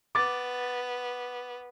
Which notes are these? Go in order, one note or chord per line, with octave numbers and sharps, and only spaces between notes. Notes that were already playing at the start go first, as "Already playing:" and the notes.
B3 D6 A6